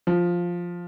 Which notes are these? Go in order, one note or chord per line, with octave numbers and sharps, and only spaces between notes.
F3